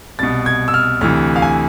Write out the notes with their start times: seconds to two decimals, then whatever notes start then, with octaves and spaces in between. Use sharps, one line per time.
0.19 C2 B2 A6
0.46 G#6
0.68 E6
0.74 F6
1.01 D2 C3 E3 F6
1.36 F5
1.42 G#5